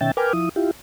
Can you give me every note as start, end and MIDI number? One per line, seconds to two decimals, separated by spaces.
0.01 0.11 47
0.01 0.11 51
0.01 0.11 61
0.01 0.11 76
0.01 0.11 79
0.01 0.11 93
0.17 0.33 70
0.17 0.33 71
0.17 0.33 79
0.17 0.33 80
0.17 0.33 86
0.17 0.33 89
0.33 0.49 53
0.33 0.49 64
0.33 0.49 87
0.56 0.71 64
0.56 0.71 65
0.56 0.71 67